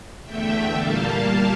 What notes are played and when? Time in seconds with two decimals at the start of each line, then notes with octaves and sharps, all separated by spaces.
0.24 E2 D3 A3 E5 G5
0.78 A#2 G3 A#3 F5 A5